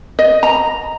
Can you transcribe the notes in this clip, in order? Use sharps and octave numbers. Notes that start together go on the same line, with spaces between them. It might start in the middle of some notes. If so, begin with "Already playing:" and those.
D#5
A#5